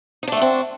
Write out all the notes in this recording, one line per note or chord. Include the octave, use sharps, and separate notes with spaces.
A3 C4 D4 D#4 F#4